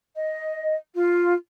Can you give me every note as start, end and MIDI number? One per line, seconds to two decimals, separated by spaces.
0.15 0.76 75
0.95 1.32 65